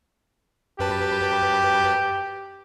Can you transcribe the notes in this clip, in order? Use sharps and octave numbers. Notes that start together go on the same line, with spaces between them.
F#2 G4 B4 A5